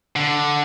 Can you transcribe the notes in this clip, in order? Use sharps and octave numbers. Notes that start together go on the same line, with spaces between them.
D3